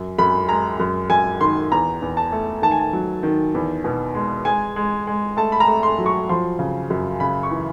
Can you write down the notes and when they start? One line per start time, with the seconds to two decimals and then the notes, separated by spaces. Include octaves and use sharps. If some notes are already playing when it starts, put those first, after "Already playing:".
Already playing: F#2
0.18 F#2 B5
0.49 G#3 A#5
0.80 F#2
1.10 F#2 G#5
1.41 D#3 C6
1.72 E2 A#5
2.02 E2
2.17 A5
2.32 A3
2.62 D#3 A5
2.71 G#5
2.79 A5
2.93 F#3
3.23 D#3
3.54 E2
3.84 B2
4.15 G#3
4.45 G#3 G#5
4.76 G#3
5.07 G#3
5.37 A3 A5
5.52 B5
5.60 A#5
5.68 A3
5.83 C6
5.98 F#3
6.06 C#6
6.29 F3 C6
6.59 C#3
6.90 F#2
7.20 C#3 B5
7.43 C#6
7.51 E3